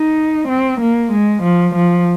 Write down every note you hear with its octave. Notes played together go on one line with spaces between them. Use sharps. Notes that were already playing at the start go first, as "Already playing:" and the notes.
Already playing: D#4
C4
A#3
G#3
F3
F3